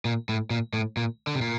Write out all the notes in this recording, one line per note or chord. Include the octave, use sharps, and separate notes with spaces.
A#2
A2
A#2
A2
A#2
D3
C3
A#2